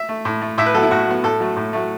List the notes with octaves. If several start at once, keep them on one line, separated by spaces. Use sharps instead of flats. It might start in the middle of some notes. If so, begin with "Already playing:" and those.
Already playing: E5
A3
A2
A3
A2 E5
B4
F#3 B3 A4
E4
A2 F#4
F#3 B3
A2 A4
F#3 A3
A2
F#3 A3